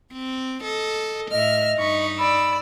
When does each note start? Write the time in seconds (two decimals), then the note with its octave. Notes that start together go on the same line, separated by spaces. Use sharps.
0.13 C4
0.62 A4 D#5
1.31 A2 D#5 E5 F6
1.79 G2 D#4 B5 C#6
2.19 D5 B5 E6